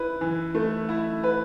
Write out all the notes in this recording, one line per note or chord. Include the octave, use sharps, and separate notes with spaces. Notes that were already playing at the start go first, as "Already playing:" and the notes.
Already playing: E4 B4
E3
A3
E4
B4